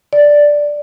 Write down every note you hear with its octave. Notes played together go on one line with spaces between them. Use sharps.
D5